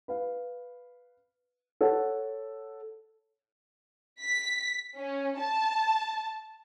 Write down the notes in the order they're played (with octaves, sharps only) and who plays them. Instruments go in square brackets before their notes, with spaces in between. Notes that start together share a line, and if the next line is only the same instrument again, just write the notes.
[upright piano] B4 F5
A4 C#5 F#5
[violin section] B6
C#4
A5